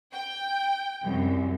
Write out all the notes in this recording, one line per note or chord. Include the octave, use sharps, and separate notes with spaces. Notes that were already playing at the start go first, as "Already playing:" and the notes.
G5
C2 F#2